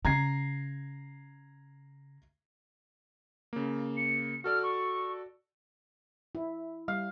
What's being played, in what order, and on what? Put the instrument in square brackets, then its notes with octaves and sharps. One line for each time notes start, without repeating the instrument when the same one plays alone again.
[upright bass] C#3 [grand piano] A#5 G#6 C7
[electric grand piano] C#3 A#3
[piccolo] C#7
[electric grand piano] F#4 A4 D5 [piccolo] F6
[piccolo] C#6
[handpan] E4
[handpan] G3 [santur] F5